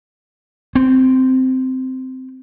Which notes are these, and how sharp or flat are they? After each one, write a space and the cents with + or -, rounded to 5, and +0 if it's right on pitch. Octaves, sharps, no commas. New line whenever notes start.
C4 -10